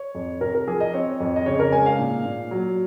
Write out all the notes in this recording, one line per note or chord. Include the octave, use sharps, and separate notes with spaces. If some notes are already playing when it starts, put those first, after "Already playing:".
Already playing: C#5
F2
C3 A#4
A#4
F3 G#4
D#5
C4 C#5
F2
D#5
C#3 C#5
A#4
G#3 G#5
F5
A#2
A#2
F#3